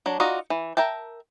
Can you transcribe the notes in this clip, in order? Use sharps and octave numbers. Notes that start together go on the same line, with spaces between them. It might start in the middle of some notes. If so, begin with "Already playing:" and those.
F#3 D4
D#4 F4 F#4 D5 D#5
E3
A#4 E5 G5 A5